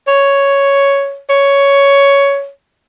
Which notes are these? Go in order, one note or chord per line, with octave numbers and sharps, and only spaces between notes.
C#5
C#5